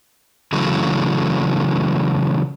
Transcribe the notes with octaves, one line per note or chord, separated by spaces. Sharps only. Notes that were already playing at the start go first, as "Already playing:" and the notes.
C#3 E3 F#3 A3